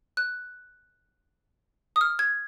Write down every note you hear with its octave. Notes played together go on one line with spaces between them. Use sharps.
F#6
D#6
F6
G#6